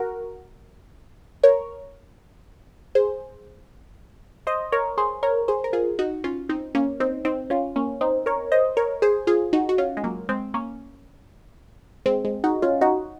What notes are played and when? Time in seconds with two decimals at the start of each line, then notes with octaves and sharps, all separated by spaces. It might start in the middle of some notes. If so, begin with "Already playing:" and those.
Already playing: F#4 A#4
1.43 A#4 C#5
2.95 G#4 C5
4.47 C5 D#5
4.72 A#4 C#5
4.98 G#4 C5
5.23 A#4 C#5
5.48 G#4 C5
5.64 A#4
5.73 F4 G#4
5.99 D#4 F#4
6.24 C#4 F4
6.49 C4 D#4
6.75 A#3 C#4
7.00 C4 D#4
7.25 C4 D#4
7.50 C#4 F4
7.76 A#3 C#4
8.01 C4 D#4
8.26 A#4 C#5
8.52 C5 D#5
8.77 A#4 C#5
9.02 G#4 C5
9.27 F4 G#4
9.53 D#4 F#4
9.69 F#4
9.78 C#4 F4
9.97 G#3
10.04 F#3 A#3
10.29 G#3 C4
10.54 A#3 C#4
12.06 G#3 C4
12.25 G#3
12.44 D#4 F#4
12.62 C#4 F4
12.81 D#4 F#4